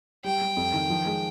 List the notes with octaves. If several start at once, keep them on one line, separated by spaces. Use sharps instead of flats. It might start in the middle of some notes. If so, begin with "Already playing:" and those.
G3 G5
G3
F2
D#3
F3
G#3